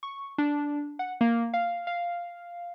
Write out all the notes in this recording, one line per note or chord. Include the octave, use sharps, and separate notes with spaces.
C#6
D4
F#5
A#3
F5
F5